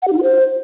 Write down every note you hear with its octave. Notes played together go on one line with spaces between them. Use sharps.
F#5
G4
D#4
F4
C5